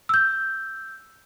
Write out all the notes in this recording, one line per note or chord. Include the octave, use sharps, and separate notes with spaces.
E6 G6